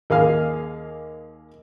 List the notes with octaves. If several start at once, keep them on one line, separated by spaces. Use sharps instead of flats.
D#2 A#3 G#4 F5 F6